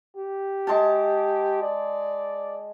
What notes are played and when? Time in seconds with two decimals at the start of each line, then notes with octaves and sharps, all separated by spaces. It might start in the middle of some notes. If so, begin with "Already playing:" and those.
0.16 G4
0.67 G#3 A5
1.62 D5